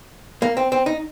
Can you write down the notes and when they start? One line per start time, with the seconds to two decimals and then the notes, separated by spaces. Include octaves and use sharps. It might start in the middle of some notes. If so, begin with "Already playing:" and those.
0.42 A#3
0.57 C4
0.72 C4
0.86 D#4